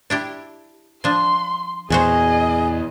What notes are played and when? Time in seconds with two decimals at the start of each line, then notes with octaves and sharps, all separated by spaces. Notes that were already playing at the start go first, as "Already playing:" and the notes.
0.10 D4 E4 G4
1.04 F3 D4 C6
1.90 E2 A#2 F#4 G#4 C5 D#5